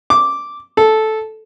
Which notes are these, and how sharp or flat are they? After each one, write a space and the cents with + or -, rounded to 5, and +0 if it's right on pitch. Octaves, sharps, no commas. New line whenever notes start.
D6 -5
A4 -10